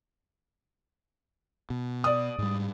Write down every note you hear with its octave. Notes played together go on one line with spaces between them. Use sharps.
B2
D5 D#6
G#2 G3